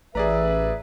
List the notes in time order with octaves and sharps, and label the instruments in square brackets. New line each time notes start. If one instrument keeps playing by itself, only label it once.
[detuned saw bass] A1 [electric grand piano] G#4 D5 A#5 [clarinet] B4 [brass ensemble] E5